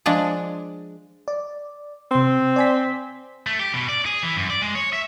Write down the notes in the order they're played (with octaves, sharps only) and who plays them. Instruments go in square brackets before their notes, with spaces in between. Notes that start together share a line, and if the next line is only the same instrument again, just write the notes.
[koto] F3 G#3 D4
[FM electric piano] D5
[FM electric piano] C3 C6 [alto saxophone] C4
[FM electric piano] D5 G#5 B6
[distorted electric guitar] A3
G4
B2
D5
G#4
E3
F#2
D5
G#3
C#5
E5